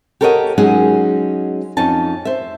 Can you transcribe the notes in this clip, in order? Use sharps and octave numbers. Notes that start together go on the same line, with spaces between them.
G4 A4 A#4 C#5 D#5 F#5
F#3 G#3 C#4 D#4 G#4 F#5
F2 C#4 D#4 A5
C5 E5